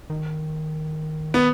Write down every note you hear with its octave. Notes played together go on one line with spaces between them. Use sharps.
D#3
B3